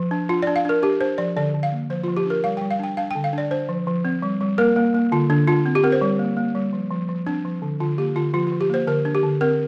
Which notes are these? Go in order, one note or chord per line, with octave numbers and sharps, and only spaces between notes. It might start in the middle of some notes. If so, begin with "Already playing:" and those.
Already playing: F3
D4
D4 F4
D4 D5
F5
D4 A#4
D4 G4
D4 C5
F3 D5
D3 D5
D3
F5
A#3
F3 C5
F3 F4
G4
D4 A#4
G3 F5
G3 G5
F5
D4 G5
D4 F5
D3 G5
F5
D4 D5
D4 C5
F3
F3
C4
G3
G3
A#3 A#4
A#3
A#3
D3 F4
D3 D4
D4 F4
C4
G4
C4 A#4
C5
G3
A#3
A#3
G3
F3
F3
F3
C4 D4
F3
D3
D3 F4
A#3 G4
D3 F4
F3 F4
F4
F3
G4
A#3 C5
D3 A#4
D4
G4
D3
C4 A#4